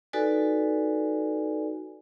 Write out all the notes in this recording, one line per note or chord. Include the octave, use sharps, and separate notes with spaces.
D#4 F#4 A4 B4 D5 G#5